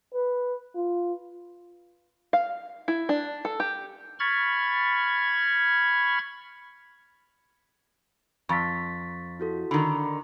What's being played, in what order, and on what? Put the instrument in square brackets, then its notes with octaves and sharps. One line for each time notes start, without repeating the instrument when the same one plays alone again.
[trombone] B4
F4
[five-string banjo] F5
E4
D4
A4
G4
[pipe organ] B5 C#6 F6 G#6 A6
[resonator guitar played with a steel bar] F2 [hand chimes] C#6 A6 B6
[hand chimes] E4 F#4 A4
[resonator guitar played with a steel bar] D3 D#3 [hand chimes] B5